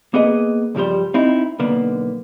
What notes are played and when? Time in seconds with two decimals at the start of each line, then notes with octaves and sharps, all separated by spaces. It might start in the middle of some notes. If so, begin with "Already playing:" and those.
0.14 A#3 B3 G#4 D#5
0.75 C#2 G2 F3 G3 C5
1.14 C4 D#4 E4
1.59 B1 D3 A#3 B3